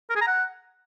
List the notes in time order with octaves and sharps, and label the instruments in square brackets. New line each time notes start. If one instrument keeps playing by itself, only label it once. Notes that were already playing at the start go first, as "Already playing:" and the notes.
[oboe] A#4
G#4
A#5
F#5